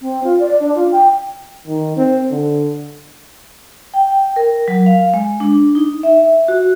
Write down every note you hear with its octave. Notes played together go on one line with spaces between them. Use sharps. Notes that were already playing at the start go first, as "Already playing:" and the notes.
C4
F4
D5
D4
F4
G5
D#3
C4
D3
G5
A#4
F#3
F5
G#3
D4
D#4
E5
F#4